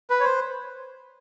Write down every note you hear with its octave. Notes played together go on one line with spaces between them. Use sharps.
B4
C#5
C5